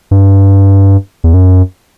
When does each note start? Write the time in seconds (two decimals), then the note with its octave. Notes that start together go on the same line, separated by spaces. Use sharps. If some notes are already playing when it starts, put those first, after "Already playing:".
0.11 G2
1.24 E2
1.34 F#2